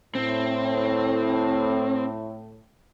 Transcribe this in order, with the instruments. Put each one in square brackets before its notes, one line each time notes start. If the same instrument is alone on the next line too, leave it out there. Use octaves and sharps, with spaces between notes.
[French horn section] A2 [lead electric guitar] C4